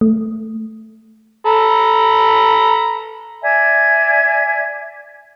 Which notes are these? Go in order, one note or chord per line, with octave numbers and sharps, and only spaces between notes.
A3
A4 A#5 B5
D5 E5 G#5 G#6